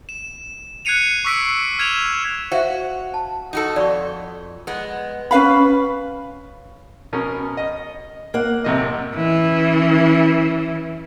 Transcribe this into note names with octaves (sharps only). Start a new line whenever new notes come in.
E7
F#6 G#6 C7 C#7 D#7 F7
C#6 D6 E6 B6 C7 D7
F6 G#6 E7 F7
F#4 C5 E5 F5
A5
D#4 F#4 A4
F2 D5 B5 C#6
G#3 B3
C#4 B4 F5 B5
B2 C#4 A#4
D#5
A#3 F#5
A1 C3 D#5
E3 C#4